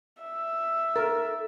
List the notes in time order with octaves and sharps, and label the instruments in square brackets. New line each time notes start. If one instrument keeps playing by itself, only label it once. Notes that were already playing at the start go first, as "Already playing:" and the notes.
[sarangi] E5
[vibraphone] A4 [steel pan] A#4